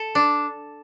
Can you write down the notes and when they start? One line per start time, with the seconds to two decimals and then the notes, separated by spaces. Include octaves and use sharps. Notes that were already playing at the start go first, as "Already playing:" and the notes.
Already playing: A4
0.15 D4